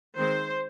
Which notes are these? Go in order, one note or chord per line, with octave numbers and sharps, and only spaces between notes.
D#3 G#3 C4 C5